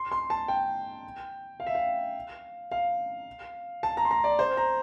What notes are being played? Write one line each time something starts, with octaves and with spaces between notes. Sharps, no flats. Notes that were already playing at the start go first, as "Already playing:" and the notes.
Already playing: C6
C6
A5
G5
F5
E5
F5
F5
A5
A#5
C6
A#5
D5
C5
A#5